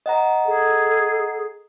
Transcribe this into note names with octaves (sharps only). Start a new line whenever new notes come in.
D#5 F#5 A#5
G#4 A4